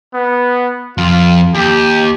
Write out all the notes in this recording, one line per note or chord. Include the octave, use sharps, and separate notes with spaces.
B3
F2 F4
D#2 G4